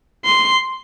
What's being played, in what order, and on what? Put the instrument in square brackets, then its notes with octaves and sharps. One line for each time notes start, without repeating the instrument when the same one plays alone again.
[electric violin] C6